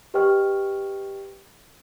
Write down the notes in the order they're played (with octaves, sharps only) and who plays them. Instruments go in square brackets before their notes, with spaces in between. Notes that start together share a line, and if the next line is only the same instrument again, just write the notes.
[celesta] G4 B4 D#5 G5 C#6 F6